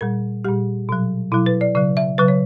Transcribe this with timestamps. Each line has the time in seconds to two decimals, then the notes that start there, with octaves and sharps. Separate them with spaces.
0.01 A#2 G3 A#4
0.45 A#2 G3 G4
0.89 B2 F#3
1.32 B2 F#3 E4
1.46 B4
1.61 D5
1.75 C#3 F#3 D5
1.97 E5
2.18 C#3 F#3 B4
2.28 C#5